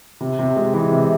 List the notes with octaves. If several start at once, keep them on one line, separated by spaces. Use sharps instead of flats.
C3
C3
G#3
E3
C3